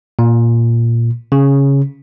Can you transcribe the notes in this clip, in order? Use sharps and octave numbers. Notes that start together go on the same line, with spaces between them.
A#2
C#3